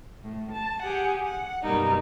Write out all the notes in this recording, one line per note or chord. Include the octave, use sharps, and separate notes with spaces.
A2
A5
G4 G#4 F#5
F#5
F#2 B2 G3 A#3 D#4